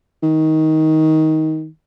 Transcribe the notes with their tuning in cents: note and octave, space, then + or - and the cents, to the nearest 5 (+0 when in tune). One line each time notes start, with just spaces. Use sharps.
D#3 +15